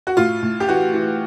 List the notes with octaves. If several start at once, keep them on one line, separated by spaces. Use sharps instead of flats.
F#4
A2 F4
A2
G4
E3 F#4
E3